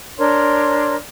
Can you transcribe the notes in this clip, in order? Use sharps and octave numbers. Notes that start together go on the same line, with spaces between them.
D4 A#4 C#5 C6